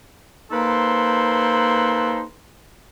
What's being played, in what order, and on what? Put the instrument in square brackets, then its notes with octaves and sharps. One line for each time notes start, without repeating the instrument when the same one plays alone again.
[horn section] A#3 D#4 A4 B4 C5 C6